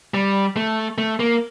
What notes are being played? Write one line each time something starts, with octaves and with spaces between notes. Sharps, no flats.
G3
A3
A3
A#3